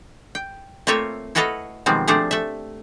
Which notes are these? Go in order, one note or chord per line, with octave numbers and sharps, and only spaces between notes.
G5
A3 A#3 C4 F4 C#5 E5
E4 F#4 A4 B4 D#5 F5
B2 D#3 F3 G3 G#3 C4
F3 A3 D4 G4 G#4 C5
A3 E5